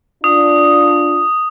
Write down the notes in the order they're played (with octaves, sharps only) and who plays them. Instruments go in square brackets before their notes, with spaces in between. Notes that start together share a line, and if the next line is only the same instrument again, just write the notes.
[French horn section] D4 F4 [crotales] D#6